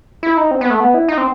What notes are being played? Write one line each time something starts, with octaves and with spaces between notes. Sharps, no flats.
E4
D#4
C4
B3
A3
B3
E4
D#4
C4